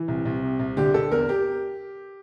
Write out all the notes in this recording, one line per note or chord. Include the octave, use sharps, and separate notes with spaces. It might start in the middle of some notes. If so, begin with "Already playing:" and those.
Already playing: E3
C2
C2
C3
C2
D3 G4
D3 A4
E2 A#4
G4